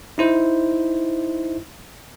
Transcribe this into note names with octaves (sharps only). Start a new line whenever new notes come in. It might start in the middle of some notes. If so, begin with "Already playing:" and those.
D#4 E4 C5